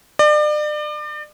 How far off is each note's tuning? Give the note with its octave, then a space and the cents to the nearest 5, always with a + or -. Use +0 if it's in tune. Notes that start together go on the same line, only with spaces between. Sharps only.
D5 +35